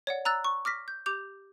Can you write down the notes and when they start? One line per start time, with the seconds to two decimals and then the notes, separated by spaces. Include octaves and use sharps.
0.07 C#5 D5 F#5
0.25 A#5 E6 F#6 A6
0.44 C#6
0.65 D6 F6 A#6 B6
0.88 G6
1.06 G4 D6 G6 F7